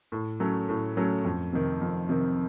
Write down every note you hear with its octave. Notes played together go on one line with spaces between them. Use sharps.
A2
F#3 A3 C#4
A2
F#3 A3 C#4
F2
C3 D#3
F2
C3 D#3